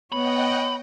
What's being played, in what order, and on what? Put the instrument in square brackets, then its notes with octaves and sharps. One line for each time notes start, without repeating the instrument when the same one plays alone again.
[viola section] B3 [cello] C#5 [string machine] D#5 F#5 G5 [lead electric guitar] B5